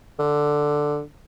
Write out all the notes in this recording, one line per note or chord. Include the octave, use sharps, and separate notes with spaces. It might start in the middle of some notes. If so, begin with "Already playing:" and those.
D3